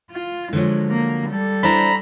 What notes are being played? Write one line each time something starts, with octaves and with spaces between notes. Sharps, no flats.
F4
D3 F3 F#3 G#3
A#3
G3 A4
D4 E4 C5 A#5 B5